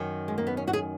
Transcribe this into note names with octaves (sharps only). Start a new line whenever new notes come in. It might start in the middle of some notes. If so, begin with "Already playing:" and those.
Already playing: F#2 D#3
G#3
A#3
B3
C#4
F#4
G#4